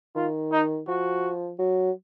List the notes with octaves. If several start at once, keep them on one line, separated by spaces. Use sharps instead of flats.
D#3 F4
D#4
F3 F#4
F#3